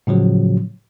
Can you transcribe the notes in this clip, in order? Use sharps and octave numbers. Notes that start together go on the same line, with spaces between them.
A2 C#3 F3 F#3